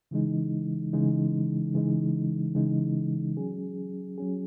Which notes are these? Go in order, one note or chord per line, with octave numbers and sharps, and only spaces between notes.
C#3 E3 G#3 D#4
C#3 E3 G#3 D#4
C#3 E3 G#3 D#4
C#3 E3 G#3 D#4
F#3 C#4 G#4
F#3 C#4 G#4